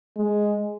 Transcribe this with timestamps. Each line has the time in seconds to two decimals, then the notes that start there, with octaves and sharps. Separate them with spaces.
0.17 G#3